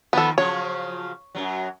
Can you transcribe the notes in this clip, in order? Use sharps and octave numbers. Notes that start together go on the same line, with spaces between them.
D#3 F3 B3 A4
C#3 F3 F#3 C#5
F#2 C3 F#3